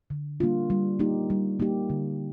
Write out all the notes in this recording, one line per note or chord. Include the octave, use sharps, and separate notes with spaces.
D3
G3 A#3 D4 F4
G3
A#3 D#4 G4
G3
A#3 D#4 G4
D3